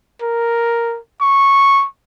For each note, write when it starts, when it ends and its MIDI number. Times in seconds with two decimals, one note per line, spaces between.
0.22 0.98 70
1.21 1.86 85